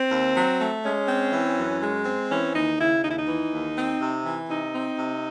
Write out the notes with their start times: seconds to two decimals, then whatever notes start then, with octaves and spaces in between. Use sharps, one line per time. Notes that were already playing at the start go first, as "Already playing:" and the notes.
Already playing: C4
0.11 D#2
0.35 F#3
0.60 A3
0.84 G#3 C#4
1.08 C4
1.33 E3
1.57 F#2
1.82 G#3
2.06 C4
2.30 E3 C#4
2.54 D#2 D#4
2.79 C#3 E4
3.03 D#2 D#4
3.11 E4
3.18 D#4
3.28 E3
3.52 D#2
3.77 C4
4.01 C3
4.25 E3
4.50 C3 D#4
4.74 C4
4.99 C3